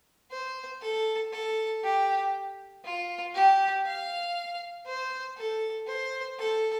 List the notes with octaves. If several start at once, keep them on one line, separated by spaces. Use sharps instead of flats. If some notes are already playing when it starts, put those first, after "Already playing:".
C5
A4
A4
G4
F4
G4
F5
C5
A4
C5
A4